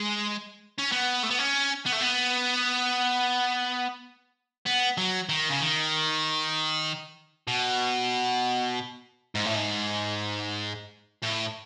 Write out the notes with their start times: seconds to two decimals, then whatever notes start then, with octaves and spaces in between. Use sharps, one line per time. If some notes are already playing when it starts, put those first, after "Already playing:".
Already playing: G#3
0.78 C#4
0.92 B3
1.23 A3
1.30 B3
1.39 C#4
1.86 B3
1.93 A3
2.01 B3
4.66 B3
4.98 F#3
5.29 D#3
5.49 C#3
5.61 D#3
7.48 B2
9.35 G#2
9.45 A2
9.55 G#2
11.22 A2